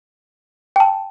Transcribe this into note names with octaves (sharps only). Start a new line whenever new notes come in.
G5
A5